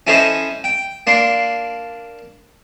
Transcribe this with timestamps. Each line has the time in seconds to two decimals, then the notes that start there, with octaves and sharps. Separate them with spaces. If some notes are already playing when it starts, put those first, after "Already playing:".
0.07 C#4 E4 A4 C5 C#5 D#5
0.64 G5
1.07 A#3 D4 C6